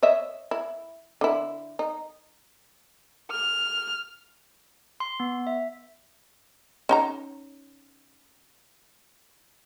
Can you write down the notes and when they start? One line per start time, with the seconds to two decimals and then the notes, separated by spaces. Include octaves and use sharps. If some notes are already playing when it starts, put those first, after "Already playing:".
0.03 C#5 D#5 E5
0.51 E4
1.21 D3 E4
1.79 D#4
3.31 F6
5.00 C6
5.20 B3
5.47 E5
6.89 C#4 D#4 A#5